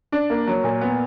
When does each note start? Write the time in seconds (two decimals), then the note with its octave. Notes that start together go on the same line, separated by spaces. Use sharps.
0.12 D4
0.30 A#3
0.47 F#3
0.64 A#2
0.81 B3